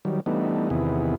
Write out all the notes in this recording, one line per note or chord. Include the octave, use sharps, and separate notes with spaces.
D#3 F#3 G3
E3 G3 A3 B3 D4 D#4
E2 C3 D#3 B3 E4 G#4